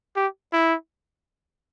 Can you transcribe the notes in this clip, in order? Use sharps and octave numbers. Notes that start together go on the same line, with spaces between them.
G4
E4